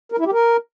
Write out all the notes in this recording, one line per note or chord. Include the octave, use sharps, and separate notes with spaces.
A#4
E4
G4
A#4